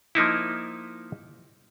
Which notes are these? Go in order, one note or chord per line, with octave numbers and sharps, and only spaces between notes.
F3 A#3 D#4 E4